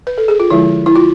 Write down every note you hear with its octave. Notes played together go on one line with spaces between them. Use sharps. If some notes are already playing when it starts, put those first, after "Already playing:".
B4
A4
G#4
F4
D3 F3 G#3 E4
E4
F4